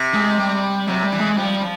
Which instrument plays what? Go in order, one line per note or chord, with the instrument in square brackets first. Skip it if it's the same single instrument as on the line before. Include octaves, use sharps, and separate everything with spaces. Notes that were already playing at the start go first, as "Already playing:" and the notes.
Already playing: [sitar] C3
[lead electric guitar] G#3
G3
[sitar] C3 [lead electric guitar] F#3
[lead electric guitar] G3
[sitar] E3
[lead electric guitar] G#3
[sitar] F3 [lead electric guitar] G3
[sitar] F3